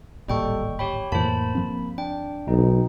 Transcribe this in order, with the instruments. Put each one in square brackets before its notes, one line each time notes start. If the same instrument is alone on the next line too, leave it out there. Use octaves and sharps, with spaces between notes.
[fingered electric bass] D1 G#1 A#2 [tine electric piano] G3 A4 [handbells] D#5 G5 C#6
[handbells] G4 C#5 G5 [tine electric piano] B5
[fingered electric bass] F2 A2 E3 [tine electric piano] A#3 B5 [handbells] C5 A5
[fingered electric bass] G2 F3 C4
[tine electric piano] D4 [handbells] G5
[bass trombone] B1 [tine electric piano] D#4